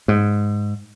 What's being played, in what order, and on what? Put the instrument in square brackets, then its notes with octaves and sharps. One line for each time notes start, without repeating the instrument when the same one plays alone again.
[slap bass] G#2